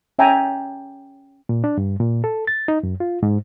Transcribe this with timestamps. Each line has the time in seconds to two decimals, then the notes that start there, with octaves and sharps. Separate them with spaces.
0.19 C#4 E5 G5 G#5 A#5
1.49 A#2
1.64 D4
1.78 G2
2.00 A#2
2.24 A4
2.47 A6
2.68 D#4
2.83 F#2
3.00 F4
3.23 G#2